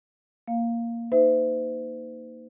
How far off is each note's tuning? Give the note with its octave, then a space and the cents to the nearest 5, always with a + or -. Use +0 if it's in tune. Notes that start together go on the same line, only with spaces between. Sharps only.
A#3 -5 F5 +0
D#4 +0 C5 -40 E5 +0